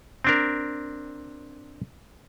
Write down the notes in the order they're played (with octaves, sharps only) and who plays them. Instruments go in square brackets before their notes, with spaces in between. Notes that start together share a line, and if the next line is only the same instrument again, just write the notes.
[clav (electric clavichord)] C4 D4 A#4